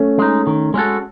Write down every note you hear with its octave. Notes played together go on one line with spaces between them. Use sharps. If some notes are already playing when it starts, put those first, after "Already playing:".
Already playing: A3 C#4
G#3 D#4
D#3
G#3 C#4 F#4 A4